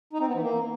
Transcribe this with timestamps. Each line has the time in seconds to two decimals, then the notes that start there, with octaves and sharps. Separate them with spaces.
0.13 D#4
0.20 C4
0.28 B3
0.35 E3
0.42 A#3